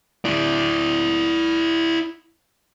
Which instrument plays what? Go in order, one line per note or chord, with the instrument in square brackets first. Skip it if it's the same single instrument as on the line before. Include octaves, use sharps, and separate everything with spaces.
[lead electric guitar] E4 D5